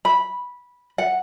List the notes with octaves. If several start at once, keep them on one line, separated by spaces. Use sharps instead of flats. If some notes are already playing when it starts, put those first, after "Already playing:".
B5
F#5